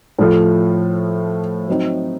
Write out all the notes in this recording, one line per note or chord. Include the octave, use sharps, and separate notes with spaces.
A2 F3 A3
F#3 C4 D#4